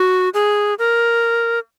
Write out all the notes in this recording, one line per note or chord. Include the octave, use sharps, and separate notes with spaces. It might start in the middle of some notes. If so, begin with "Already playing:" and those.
Already playing: F#4
G#4
A#4